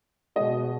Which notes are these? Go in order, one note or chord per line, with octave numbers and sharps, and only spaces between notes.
B2 G#3 D#5